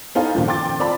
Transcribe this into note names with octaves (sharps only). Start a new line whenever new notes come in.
B3 D#4 A4 C5 F5 G#5
G2 A#2 D#3 F3
G5 C6 D6 A6
C4 F4 D5 A5 B5